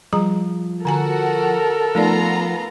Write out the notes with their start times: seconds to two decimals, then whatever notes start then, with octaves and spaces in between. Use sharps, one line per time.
0.13 F3 G3 G#4 A#5
0.85 D3 F#4 A4 A#4 F#5 G#5 A#5
1.95 F3 A3 B3 D#4 F4 D5 A#5